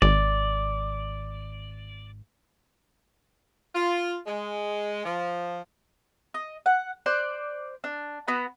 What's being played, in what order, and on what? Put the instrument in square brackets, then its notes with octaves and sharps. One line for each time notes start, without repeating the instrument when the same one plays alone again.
[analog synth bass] G#1 [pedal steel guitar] D5
[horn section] F4
G#3
F3
[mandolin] D#5
F#5
C5 D5 F#6
D4
B3 F#4 B4